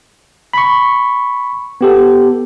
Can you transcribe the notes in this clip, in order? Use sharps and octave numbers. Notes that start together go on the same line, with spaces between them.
B5 C#6
B3 G4 A4